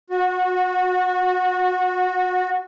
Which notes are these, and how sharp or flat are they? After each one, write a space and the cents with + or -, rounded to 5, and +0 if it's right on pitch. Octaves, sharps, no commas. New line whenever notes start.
F#4 -20